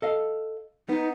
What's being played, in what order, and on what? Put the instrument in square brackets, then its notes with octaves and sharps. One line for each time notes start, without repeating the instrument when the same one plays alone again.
[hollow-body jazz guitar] A4 D#5 F5
[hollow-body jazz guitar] B3 [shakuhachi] D#4